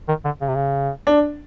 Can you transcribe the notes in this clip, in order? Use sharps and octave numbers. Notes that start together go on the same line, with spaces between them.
D#3
D3
C#3
C3
C#3
D4